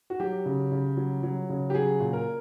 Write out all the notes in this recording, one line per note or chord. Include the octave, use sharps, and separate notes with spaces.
F#4
F#3 G4
C#3
C#3
F#3
F#3
C#3
G4
F#3 G#4
A#2
A#4